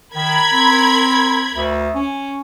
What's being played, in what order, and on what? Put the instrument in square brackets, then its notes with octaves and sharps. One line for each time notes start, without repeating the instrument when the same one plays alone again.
[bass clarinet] D#3 [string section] A#4 B5 G#6
[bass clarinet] C4
D2
C#4